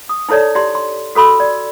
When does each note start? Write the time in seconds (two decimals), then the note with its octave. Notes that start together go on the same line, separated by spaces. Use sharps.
0.09 D#6
0.29 D#4 E4 A4 C#5 D5
0.55 E4 G4 D5 C6
0.75 C6
1.15 F#4 A4 B5 C6 E6
1.40 D5